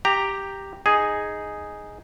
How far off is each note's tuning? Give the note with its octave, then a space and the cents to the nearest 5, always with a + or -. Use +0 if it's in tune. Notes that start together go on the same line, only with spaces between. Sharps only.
G4 +0 A#5 -5
D#4 +0 G#4 +0